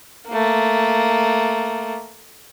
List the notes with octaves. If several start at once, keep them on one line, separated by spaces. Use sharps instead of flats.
A3 A#3